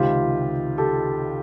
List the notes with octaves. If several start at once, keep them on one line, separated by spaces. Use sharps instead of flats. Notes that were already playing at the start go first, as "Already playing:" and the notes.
Already playing: C#2 C3 D#3 F4 G4
G4 A4